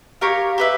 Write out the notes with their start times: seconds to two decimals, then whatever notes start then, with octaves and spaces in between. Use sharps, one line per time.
0.21 G4 A#4 C#5 F5
0.58 G4 B4 E5